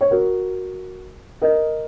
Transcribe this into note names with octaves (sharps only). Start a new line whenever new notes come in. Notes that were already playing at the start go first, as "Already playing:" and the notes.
C#5
F#4 A#4
A#4 D#5